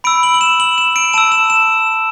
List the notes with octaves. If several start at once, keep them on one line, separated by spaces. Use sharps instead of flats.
B5 E6 D7
F#7
F#7
E7
F#7
E7
D7
A5 E6 E7
E7
E7